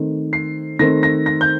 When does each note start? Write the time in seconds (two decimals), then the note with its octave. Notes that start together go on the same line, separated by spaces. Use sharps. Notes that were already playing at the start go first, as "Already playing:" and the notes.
Already playing: D#3 A3 C4
0.33 C7
0.79 D#3 A3 C4 A#6
1.03 A#6
1.26 A#6
1.41 G6